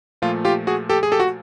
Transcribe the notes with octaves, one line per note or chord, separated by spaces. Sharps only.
A#2 F3 A3 F4
F4 G4
F#4 G#4
G4 A4
G#4
G4 A4
F#4